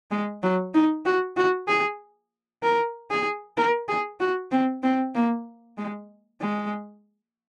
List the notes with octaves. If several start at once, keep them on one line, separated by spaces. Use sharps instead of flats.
G#3
F#3
D#4
F#4
F#4
G#4
A#4
G#4
A#4
G#4
F#4
C4
C4
A#3
G#3
G#3